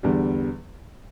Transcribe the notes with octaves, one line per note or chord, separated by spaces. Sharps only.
E2 D3 G3